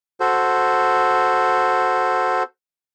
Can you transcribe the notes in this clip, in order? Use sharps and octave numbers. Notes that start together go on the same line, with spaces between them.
F#4 A4 C5